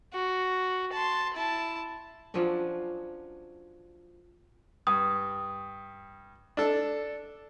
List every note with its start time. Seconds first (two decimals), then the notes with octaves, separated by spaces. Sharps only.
0.13 F#4
0.93 A5 C6
1.34 E4 A5
2.34 F3 F#3 C#4 D4
4.87 G2 D#6
6.57 D4 A4